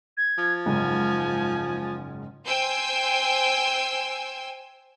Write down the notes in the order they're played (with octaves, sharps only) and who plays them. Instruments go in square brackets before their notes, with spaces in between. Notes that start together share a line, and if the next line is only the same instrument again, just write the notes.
[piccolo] G#6
[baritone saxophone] F3
[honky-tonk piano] F#1 G#2 [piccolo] G#5
[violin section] C5 G5 G#5 E6 G6